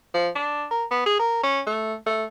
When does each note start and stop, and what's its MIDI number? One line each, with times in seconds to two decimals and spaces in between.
0.14 0.29 53
0.35 0.65 62
0.71 0.85 70
0.91 1.04 59
1.06 1.19 68
1.19 1.40 70
1.43 1.61 61
1.66 1.94 57
2.06 2.24 57